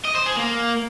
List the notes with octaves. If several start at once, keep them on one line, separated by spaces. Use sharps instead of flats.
D#5
C5
G#4
A#3